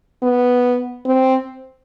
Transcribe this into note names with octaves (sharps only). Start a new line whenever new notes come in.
B3
C4